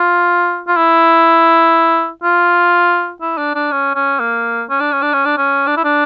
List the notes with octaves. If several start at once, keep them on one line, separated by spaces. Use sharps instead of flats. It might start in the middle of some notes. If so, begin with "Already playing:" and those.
Already playing: F4
F4
E4
F4
E4
D4
D4
C#4
C#4
A#3
C#4
D4
C#4
D4
C#4
D4
C#4
D4
E4
D4